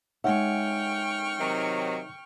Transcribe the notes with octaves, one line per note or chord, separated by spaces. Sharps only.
G#3 D#4 C#5 E5 F#5 G5 C#6 F6
C3 D#3 F#3